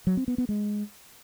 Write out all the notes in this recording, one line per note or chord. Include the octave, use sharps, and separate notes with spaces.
F#3
C4
B3
B3
G#3